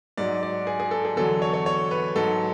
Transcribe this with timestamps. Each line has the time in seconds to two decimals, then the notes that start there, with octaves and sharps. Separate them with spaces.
0.17 G#2 F#3 D5
0.43 D5
0.67 G#4
0.80 G#4
0.91 A4
1.05 G#4
1.16 E2 D3 F#3 A4
1.42 C#5
1.53 C#5
1.66 C#5
1.91 B4
2.16 G#2 F#3 A4